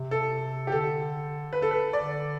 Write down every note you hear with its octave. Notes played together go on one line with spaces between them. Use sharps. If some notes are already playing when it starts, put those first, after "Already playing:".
Already playing: C3
A4
G4
D3 A4
B4
A4
B4
D3 D5